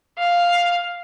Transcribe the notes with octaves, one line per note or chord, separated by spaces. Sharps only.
F5